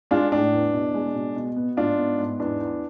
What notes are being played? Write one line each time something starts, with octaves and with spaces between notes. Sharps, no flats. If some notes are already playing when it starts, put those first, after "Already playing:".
G#3 D4 F4
A2 D4
E2
B2
G#3
B2
B2
B3
G#2 D4 F4
B3
G#2
E2 D4
E2